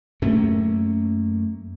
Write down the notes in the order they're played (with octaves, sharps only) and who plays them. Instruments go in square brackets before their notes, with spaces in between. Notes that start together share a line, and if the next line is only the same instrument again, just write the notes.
[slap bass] F#2 A3 A#3 C#4